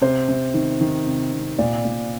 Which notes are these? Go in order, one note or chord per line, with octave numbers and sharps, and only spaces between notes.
C3 C5
C3
D#3
D#3
C3
C3
A#2 D5
A#2